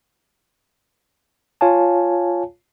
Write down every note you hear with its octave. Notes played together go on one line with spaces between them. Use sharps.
F4 C#5 F5 G#5 A5